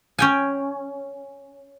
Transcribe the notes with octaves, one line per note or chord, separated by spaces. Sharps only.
C#4 G5 G#5